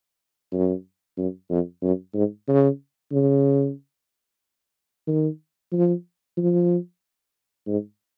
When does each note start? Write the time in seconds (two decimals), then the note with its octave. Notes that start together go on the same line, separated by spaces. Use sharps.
0.53 F#2
1.17 F#2
1.50 F2
1.82 F#2
2.14 G#2
2.48 C#3
3.12 C#3
5.08 D#3
5.72 F3
6.37 F3
7.67 G#2